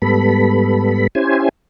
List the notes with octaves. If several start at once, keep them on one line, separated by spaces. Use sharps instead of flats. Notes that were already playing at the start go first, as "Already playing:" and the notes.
G#2 G3 B3 A4 B5
C#4 E4 G4 C5 G#5